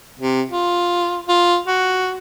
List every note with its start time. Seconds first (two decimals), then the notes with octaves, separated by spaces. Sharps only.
0.20 C3
0.50 F4
1.28 F4
1.67 F#4